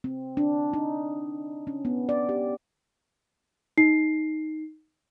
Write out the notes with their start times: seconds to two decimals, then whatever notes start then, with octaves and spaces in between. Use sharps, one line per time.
0.04 C4
0.37 D4
0.73 D#4
1.67 C#4
1.85 B3
2.09 D5
2.29 G4
3.77 D#4 C7